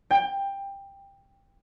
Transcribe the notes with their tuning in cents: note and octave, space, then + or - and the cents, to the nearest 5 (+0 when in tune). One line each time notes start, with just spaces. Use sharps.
G5 +15